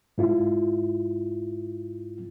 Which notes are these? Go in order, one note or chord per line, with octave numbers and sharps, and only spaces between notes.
G#2 E4 F4